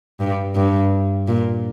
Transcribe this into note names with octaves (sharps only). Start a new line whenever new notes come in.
G2
G2
A#2